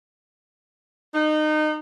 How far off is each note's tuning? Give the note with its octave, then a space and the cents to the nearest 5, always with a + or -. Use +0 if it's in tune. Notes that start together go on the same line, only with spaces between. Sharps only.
D#4 -25